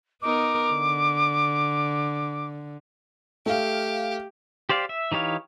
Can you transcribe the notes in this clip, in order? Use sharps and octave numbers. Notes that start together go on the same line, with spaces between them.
B3 D#4 A#4 D6
D3
A3 G4 F5
G4 C5 D5 F5
E5
E3 D#4 G4 C#5 F5